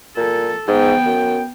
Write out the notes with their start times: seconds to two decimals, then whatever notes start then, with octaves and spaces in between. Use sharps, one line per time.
0.17 A#2 A4
0.68 G#2 B3 G5
1.06 F#2